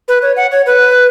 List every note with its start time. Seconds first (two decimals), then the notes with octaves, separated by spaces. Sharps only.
0.08 B4
0.22 C#5
0.37 F#5
0.52 C#5
0.66 B4